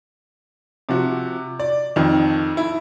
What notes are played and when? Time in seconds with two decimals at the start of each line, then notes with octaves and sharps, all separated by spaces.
0.89 C3 F3 F#4
1.60 D5
1.96 F2 D#3
2.57 E4